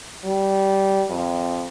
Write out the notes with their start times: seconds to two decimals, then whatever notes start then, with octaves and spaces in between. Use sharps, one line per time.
0.24 G3
1.10 F2